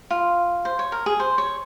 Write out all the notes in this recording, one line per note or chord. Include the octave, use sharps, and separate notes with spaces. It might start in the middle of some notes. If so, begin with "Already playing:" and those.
F4
C5
C#5
A#4
G#4
C5
C#5